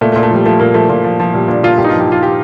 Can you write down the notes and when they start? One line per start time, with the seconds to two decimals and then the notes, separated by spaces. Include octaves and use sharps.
0.01 A#2 A3
0.12 A3
0.16 A#2
0.23 A3
0.31 F3 G3
0.46 F3 A3
0.60 A#2 A#3
0.74 F3 A3
0.89 A#2
1.04 F3
1.20 F3
1.34 A#2 G3
1.48 A#2 D4
1.63 A#2 F4
1.78 G2 G4
1.84 D#4
1.89 F4
1.93 F3
2.00 G4
2.07 F3 F4
2.23 G4